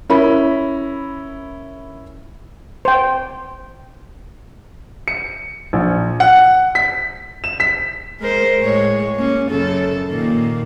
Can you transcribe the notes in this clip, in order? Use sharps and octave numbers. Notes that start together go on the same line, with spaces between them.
C#4 E4 A#4 B5
C5 G5
C#7
A#1
F#5
B6
E7
B6
G#3 A#4 C5
A2 G#3 C#5
A#3 C#4
F#2 C#3 A4
A#2 D#3 A#3